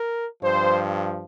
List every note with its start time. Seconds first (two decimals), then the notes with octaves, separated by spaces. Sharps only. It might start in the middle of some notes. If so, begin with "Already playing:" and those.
Already playing: A#4
0.43 G2 F3 C5